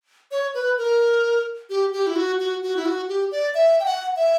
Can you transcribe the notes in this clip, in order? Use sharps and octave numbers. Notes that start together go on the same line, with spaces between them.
C#5
B4
A#4
G4
G4
E4
F#4
F#4
F#4
E4
F#4
G4
D5
E5
G5
F#5
E5